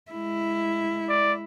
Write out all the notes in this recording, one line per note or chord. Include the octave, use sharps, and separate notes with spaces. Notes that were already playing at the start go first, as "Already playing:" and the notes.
G#3 E4
D5